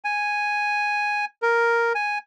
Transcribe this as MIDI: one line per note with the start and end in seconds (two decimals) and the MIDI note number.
0.05 1.25 80
1.42 1.93 70
1.95 2.18 80